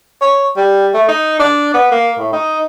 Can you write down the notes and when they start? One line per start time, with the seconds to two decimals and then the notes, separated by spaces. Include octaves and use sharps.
0.21 C#5
0.57 G3
0.94 A3
1.08 D#4
1.39 D4
1.74 B3
1.91 A#3
2.19 A2
2.33 D#4